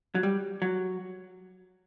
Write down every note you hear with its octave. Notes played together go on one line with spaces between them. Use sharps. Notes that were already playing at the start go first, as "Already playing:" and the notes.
F#3
G3
F#3